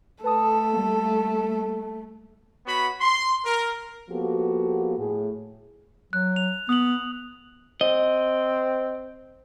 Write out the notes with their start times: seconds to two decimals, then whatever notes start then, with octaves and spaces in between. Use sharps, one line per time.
0.24 A3 A4 B4 A5 D#6
0.73 G3 A#3
2.66 B3 F#4 C#5 B5
3.00 C6
3.45 A#4 A#5
4.10 F3 A#3 B3 F#4 G4 A4
4.97 A2 G#4
6.13 F#3 F#6
6.36 F7
6.69 B3 D#6 F#7
7.81 C4 D#5